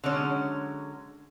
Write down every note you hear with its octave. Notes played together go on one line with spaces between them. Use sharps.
D3 F#3 G#3 C#4